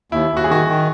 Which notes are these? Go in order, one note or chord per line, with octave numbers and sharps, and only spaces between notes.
D#2 E4
D#2
F#4
G#4
D#3 F#4
D#3